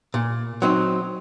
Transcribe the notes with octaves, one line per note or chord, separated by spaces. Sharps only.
A#2
F#3 C4 D#4